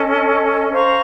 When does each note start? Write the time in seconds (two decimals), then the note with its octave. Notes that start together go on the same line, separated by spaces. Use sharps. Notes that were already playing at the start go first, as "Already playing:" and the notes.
Already playing: C#4 A4 D#5
0.72 C5 F5 A#5 C#6